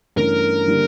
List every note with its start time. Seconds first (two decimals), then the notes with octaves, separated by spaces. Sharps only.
0.16 G2 E3 A3 C#4 A#4
0.67 D3 G3 A#3